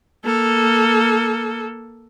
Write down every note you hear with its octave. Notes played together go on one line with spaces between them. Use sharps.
A#3 A4